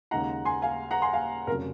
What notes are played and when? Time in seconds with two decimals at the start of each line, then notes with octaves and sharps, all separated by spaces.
0.11 D#2 C#3 G#3 D#4 F#5 A#5
0.45 G#5 C6
0.62 F5 G#5
0.91 F#5 A#5
1.02 G#5 C6
1.13 F5 G#5
1.47 F1 A#4
1.50 C#3 F#3